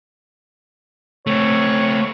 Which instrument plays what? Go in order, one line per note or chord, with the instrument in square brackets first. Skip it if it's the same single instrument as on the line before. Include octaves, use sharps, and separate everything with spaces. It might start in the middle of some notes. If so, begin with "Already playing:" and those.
[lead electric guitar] A3 C4 [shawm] C#5